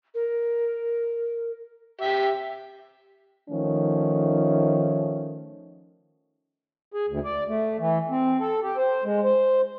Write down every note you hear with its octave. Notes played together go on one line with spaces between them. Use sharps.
A#4
G4 E5
D#3 F3 A3 C#4
G#4
D2
D5
A3
E3
C4
A4
G4
C5
G#3
C5